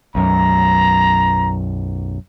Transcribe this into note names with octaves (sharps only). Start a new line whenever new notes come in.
B1 F#2 A#5